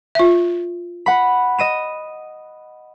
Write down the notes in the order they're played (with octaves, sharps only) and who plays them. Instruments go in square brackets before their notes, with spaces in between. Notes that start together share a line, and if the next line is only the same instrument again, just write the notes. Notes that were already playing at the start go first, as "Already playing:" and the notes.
[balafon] F4 E5
[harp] F#5 B5
D#5 D#7 E7